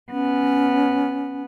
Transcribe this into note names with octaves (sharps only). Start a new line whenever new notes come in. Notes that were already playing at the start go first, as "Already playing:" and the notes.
B3 C#4